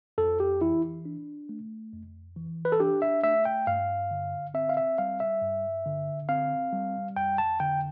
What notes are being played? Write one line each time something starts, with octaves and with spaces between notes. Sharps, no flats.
F2 A4
G4
E3 E4
D4
A3
F2
E3
B4
A4
D4 G4
E5
A3 E5
G5
G2 F5
D3
C4 E5
F5
E5
G3 F5
E5
G2
D3
C4 F5
G3
F2 G5
A5
D3 G5